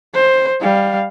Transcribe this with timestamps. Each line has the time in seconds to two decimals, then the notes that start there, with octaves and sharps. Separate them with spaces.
0.14 C5
0.61 G3 F5